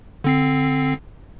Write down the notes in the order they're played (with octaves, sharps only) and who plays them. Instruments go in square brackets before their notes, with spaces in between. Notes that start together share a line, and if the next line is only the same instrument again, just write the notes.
[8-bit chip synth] D3 C4 C7